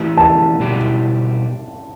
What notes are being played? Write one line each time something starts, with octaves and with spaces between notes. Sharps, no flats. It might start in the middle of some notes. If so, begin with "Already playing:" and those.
Already playing: E3 A3 E4 G4
A5
B2 G3 E4 G4